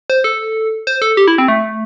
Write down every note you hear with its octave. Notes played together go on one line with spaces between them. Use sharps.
C5
A4
C5
A4
G4
E4
C4
A3